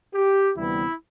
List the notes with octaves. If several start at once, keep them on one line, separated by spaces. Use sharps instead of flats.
G4
D2 C3 E3 G3 B3 E4